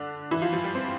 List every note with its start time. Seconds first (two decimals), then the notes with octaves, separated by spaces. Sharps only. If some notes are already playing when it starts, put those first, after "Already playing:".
Already playing: D3 D4
0.31 E3 E4
0.42 F3 F4
0.53 F3 F4
0.64 G3 G4
0.75 C4 C5